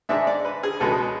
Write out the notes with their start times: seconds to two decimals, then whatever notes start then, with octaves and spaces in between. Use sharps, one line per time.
0.09 G#2 G#3 D4 E5
0.27 D5
0.45 B4
0.63 G#4
0.80 C#2 B2 G#3 B3 A4